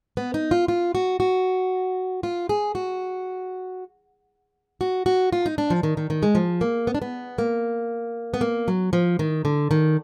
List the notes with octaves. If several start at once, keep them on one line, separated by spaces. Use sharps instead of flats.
B3
D#4
F4
F4
F#4
F#4
F4
G#4
F#4
F#4
F#4
F4
D#4
D4
F3
D#3
D#3
D#3
G#3
F3
A#3
B3
D4
B3
A#3
B3
A#3
F#3
F3
D#3
D3
D#3